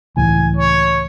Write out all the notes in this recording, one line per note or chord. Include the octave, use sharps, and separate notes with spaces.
C#2 A2 E3 G#5
C#5